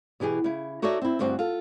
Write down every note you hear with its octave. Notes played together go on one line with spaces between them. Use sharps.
B2 E3 G4 G#4
C#3 E4
D#4 F#4 A4 C#5 D5 E5
C4 E4
D2 G2 C4 F#4 C5
F4 A4